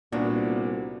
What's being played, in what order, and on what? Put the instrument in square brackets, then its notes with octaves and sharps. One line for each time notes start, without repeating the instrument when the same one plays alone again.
[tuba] C2 [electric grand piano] A#2 A#3 B3 [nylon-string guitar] D4 F#4